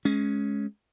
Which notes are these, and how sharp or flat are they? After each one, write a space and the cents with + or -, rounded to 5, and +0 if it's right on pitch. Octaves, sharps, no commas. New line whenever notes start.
G#3 +20 C#4 +0